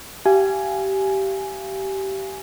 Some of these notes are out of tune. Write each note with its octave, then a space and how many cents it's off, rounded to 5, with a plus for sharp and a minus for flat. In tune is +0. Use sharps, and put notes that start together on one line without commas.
G4 -20 F5 -30 G#5 +5